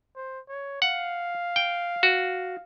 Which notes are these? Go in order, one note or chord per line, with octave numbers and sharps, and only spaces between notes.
C5
C#5
F5 F#5
G5
F#4